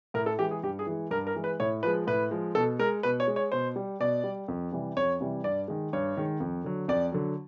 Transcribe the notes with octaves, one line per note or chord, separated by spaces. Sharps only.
A2 A#4
A4
E3 G#3 G4
G#4
G2 G4
G#4
E3 G#3
G2 A#4
A#4
E3 G#3
B4
A2 C#5
F3 G#3 B4
A2 B4
F3 G#3
B2 A4
G#3 A#4
B2 B4
C#5
G#3
C#5
B2 C5
G3
B2 D5
G3
F2
C3 E3 G3
F2 C#5
C3 E3 G3
G2 D5
D#3 G#3
G2 C#5
D#3 G#3
F2
D3 F#3
F2 D5
D3 F#3